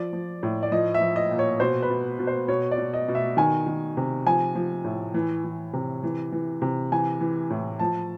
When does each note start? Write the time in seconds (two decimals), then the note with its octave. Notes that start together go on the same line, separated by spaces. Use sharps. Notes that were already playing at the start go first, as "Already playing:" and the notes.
Already playing: F3 D5
0.13 F3
0.43 A2
0.63 D5
0.72 F3 D#5
0.94 E5
1.01 F3
1.16 D#5
1.31 A#2
1.39 C#5
1.60 B2 C5
1.82 B4
1.90 B2
2.19 B2
2.27 C5
2.48 B2 C#5
2.71 D5
2.78 B2
2.94 D#5
3.08 B2
3.15 E5
3.37 D#3 G#5
3.67 D#3
3.97 C3
4.26 F3 G#5
4.55 F3
4.84 A2
5.14 E3
5.44 E3
5.73 C3
6.03 E3
6.32 E3
6.62 C3
6.92 E3 G#5
7.20 E3
7.50 A2
7.79 F3 A5